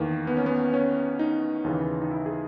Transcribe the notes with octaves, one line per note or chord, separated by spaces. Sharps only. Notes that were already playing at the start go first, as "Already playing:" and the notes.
Already playing: E2 D#3 A#3
B3
C#4
B3
C#4
D#4
D#2 C#3 E3
D#4
E4
G#4